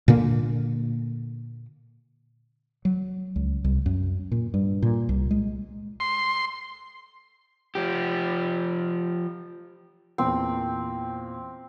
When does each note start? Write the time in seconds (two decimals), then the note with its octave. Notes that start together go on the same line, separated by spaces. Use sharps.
0.08 A#2 D3 A#3
2.85 F#3
3.36 C#2
3.64 C2
3.86 F#2
4.32 A#2
4.54 G2
4.82 A#2
5.09 C2
5.31 G#3
6.00 C6
7.75 F3 G4
10.18 E2 A#2 C4 G5